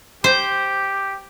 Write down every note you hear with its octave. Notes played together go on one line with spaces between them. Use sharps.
G4 C5